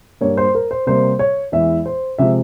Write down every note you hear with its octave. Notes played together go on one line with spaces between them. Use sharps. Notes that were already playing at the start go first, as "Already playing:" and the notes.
G2 G3 A#3 C#5
C5
A#4
C5
C3 G3 A#3 C5
C#5
E2 E3 G#3 E5
C5
C3 F3 G#3 E5